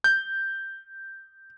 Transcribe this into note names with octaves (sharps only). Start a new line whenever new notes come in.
G6